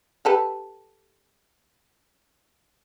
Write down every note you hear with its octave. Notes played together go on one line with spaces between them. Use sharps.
G4 A4 B4